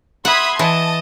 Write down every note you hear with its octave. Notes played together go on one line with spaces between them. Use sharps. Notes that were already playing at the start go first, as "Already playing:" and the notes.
E5 F#5 B5 C6 D#6 G#6
E3 D#5 A5